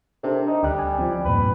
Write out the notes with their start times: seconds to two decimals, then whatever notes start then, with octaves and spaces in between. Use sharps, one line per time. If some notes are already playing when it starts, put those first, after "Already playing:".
0.23 C3 D4 A4 A#4
0.47 D#4
0.63 D2 G3 F#6
0.79 G#5
0.99 F3 C4
1.25 E2 G2 A#2 B4